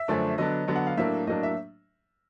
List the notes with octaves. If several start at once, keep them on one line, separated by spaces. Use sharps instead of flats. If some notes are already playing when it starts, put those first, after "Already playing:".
Already playing: E5
F#2 D3 F3 A3 D4
D3 F#3 B3 D4 D#5
D3 F#3 B3 D4
F#5
F5
A2 F#3 A#3 D4 E5
A2 F#3 A#3 D4 D#5
E5